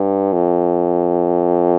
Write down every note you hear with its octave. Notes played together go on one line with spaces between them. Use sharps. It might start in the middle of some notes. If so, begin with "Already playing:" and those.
Already playing: G2
F2